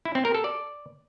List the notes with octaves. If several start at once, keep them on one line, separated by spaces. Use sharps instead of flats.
E4
C4
A#4
A4
D5